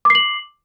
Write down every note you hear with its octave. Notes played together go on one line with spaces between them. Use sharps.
D6 C7 F#7